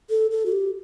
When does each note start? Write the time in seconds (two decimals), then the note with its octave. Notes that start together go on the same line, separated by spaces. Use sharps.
0.10 A4
0.31 A4
0.46 F#4
0.52 G4